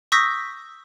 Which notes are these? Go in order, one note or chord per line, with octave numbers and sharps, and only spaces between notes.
C#6 D#6 E6 G6 A#6 B6